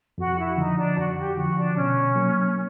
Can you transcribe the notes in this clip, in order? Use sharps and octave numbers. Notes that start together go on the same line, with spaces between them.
F2 F#4
E4
D3 F3 D#4
D4
F2 F#4
G4
D3 F3 F#4
D4
B2 C#4
F#3 A#3